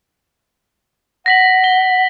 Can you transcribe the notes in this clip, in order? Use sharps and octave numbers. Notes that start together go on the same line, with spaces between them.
F#5 A#6 B6 F#7
G7